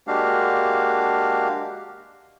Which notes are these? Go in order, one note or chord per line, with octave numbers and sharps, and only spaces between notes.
G#3 A#3 D4 F#4 G4 F5